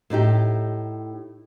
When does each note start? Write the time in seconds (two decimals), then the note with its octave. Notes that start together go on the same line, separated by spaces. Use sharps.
0.10 A2 A3 D#4 G4